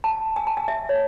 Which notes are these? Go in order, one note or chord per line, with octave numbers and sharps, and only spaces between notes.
A5
G#5
A5
G#5
E5
C#5